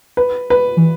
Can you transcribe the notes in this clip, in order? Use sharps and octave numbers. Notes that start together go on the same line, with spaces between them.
B4
B4
E3